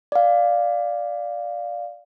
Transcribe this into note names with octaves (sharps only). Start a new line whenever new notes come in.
D5 F5